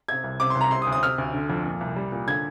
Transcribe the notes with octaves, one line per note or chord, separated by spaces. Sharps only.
C3 G#6
C2
C3 D6
C6
C2
A#5
C3 C6
D#6
D2
D#6
C3 F6
D2
D3
F2
A#2
C2
G3
A#2
D3 G#6